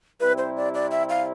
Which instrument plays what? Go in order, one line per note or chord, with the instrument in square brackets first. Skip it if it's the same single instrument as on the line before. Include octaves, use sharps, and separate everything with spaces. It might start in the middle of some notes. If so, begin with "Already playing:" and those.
[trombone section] C3 G3 C4 E4 [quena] B4
[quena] C5
D5
D5
E5
F5